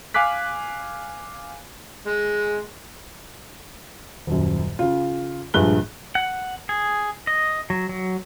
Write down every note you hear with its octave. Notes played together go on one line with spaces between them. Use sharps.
F5 G#5 D6 F#6 B6
G#3
D#1 F#2
C#3 F4
A#1 G2 G#3 F#6 G7
F#5
G#4
D#5
F#3
F#3